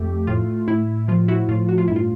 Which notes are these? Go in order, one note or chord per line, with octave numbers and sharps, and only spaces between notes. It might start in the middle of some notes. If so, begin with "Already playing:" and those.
Already playing: F2 A3 G4
A2 F4
A2 E4
F3 F4
E4 F#4
A2 F4
F#4
F4
G2 E4
F4